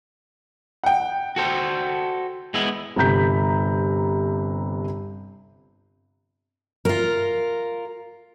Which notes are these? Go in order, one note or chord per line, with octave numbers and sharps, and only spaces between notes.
F#5 G5
F#4 A4 C5
G#3 B3 E4
G1 C3 A#5 G6 B6
F4 A#4